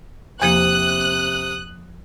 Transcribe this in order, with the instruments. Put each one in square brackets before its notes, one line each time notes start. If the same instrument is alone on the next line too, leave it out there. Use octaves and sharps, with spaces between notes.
[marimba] E2 F3 A#3 [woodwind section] C3 [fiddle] D#6 [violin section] F#6